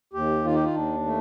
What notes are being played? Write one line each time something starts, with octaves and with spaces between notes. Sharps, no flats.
D#2 G4
D#3 F4
G4
F4
D#2 D4
A3